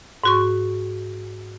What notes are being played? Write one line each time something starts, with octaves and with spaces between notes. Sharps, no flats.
G#2 F#4 C#6